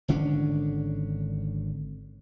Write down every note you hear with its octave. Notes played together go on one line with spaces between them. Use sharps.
G#1 D3 C#4 D4